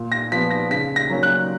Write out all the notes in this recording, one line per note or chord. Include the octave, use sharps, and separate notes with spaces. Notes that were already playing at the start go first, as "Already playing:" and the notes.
Already playing: A#2
A#6
F3 B3 B6
A#6
C#3 B6
A#6
F#3 A#3 C#4
F#6